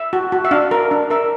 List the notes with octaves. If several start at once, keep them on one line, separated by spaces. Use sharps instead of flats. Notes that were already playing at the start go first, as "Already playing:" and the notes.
Already playing: E5
F#4
F#4
E5
D4 F5
A#4
D4
A#4 E5